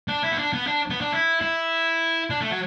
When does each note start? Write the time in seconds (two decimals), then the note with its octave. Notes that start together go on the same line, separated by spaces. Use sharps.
0.08 D4
0.23 E4
0.32 B3
0.38 D4
0.53 B3
0.67 D4
0.90 B3
1.01 D4
1.13 E4
1.41 E4
2.30 D4
2.41 A3
2.50 F#3